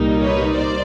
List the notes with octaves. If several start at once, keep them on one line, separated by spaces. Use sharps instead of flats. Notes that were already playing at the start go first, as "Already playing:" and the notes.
Already playing: C2 A#2 G3 A#3 D#4
B4 C#5
C5 D5